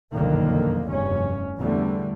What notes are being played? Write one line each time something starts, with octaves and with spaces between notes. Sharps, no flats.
F#1 B1 F2 D3 D#3 A#3
F1 E2 G2 C#4
E2 D3 G3 A3